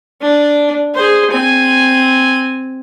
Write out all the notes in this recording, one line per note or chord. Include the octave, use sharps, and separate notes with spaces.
D4
G#4 C5
C4 G#5